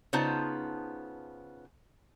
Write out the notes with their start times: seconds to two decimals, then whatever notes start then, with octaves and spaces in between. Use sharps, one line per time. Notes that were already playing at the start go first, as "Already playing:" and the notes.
0.13 C#3 B3 D#4 F4 C5 A5